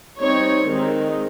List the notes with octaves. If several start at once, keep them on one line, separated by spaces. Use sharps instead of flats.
G3 C4 D#4 C#5
D#3 G#3 C4 D#4